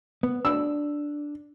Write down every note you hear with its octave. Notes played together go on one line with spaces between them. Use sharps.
B3
D4 E6